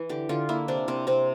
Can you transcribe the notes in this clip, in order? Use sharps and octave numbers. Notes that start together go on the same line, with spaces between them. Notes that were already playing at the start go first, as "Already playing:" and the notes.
Already playing: E3
D3 G4
D3 F4
A#3 E4
C3 D4
C3 C4
C3 C4